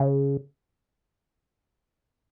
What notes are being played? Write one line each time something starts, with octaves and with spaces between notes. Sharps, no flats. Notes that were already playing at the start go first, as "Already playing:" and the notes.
Already playing: C#3